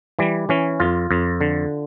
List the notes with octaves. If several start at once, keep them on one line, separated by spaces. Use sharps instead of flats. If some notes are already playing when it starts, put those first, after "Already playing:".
E3 G3
E3 C#4
F2 F4
F2
D3